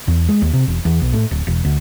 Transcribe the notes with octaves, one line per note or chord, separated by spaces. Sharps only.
E2
G#3
D#2
C3
E1
E2
B1
A2
D1
E1
D2